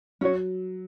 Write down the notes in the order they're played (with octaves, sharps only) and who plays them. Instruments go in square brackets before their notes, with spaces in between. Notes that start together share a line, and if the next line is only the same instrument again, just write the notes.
[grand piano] F#3 [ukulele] C#4 F#4 C#5